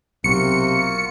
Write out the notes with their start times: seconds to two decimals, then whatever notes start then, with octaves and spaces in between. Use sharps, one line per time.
0.24 B1 C3 A#3 F4 F#4 C#7